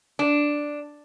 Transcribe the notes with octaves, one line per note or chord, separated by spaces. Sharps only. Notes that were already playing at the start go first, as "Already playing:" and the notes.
D4